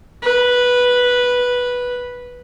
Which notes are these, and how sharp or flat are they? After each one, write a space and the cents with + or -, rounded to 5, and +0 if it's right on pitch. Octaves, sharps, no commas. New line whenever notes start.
B4 -5